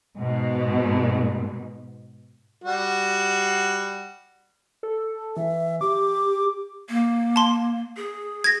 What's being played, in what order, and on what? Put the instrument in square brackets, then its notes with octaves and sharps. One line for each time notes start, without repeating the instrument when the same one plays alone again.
[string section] G#2 B2
[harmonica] G3 F#4
[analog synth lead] A4
[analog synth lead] E3 [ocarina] E5
[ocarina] G4 [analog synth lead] D6
[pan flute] A#3
[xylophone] A5 C6
[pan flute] G#4
[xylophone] G#6 A#6